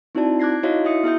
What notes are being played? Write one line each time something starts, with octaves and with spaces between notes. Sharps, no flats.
C4 D#4 E4 F#4 D5 A5
D6 F#6 G#6 A#6 C7
D#4 E4 F#4 C#5 D#5 F5
E4 F#4 E5 D#6 C#7
B3 E4 G#4 E5 D#6 G6